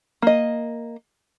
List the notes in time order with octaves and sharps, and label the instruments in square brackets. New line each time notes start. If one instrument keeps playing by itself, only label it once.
[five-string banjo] A#3 D#5